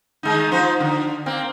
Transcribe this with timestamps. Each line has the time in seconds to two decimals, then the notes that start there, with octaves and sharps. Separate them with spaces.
0.23 D#3 G#3 D#4
0.51 F3 D#4 C5
0.80 D3
1.26 A#3 C4